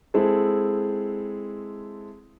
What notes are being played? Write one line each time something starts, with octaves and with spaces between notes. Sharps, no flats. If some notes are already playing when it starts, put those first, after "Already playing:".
G#3 C4 E4 G#4 A4